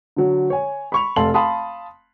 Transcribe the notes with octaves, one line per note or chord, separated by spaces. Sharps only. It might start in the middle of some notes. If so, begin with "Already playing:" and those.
D3 F#3
C#5 G#5
B5 C#6 F7
F1 A4 F5 A5 C6 F#7
F5 A5 B5 C6 D#6